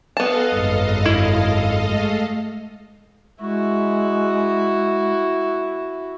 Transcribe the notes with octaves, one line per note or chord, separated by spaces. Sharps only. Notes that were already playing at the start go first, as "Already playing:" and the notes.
B3 A4 D#5 F5 A5
G#1 F#2
E4
G#3 A3
G#3 E4 F#4